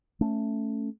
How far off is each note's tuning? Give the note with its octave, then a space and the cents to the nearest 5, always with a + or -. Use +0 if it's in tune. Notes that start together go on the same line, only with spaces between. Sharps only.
A3 +0 C#4 +0